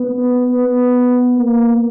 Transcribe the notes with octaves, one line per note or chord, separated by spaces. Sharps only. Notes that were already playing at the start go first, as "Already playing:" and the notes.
Already playing: B3
B3
A#3